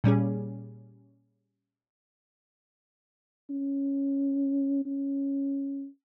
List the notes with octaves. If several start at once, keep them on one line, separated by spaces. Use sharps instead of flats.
A#2 G3 C#4 G#4
C#4
C#4